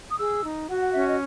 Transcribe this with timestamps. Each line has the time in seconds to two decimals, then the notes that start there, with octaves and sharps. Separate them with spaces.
0.09 D#6
0.18 G#4 E6
0.44 D#4
0.69 F#4 F#5
0.81 F#5
0.93 C#4 E5
1.07 D#5